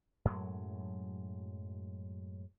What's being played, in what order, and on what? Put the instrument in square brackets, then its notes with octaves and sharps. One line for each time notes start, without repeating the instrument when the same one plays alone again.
[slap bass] F#2 A2 F#3 G#3